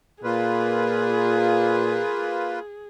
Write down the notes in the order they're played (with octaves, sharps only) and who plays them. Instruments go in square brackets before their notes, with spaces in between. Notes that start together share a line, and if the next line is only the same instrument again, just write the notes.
[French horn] A#2 [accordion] A#3 F4 B4 [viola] G#4